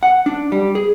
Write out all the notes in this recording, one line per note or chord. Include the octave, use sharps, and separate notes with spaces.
F#5
D4
G3
G#4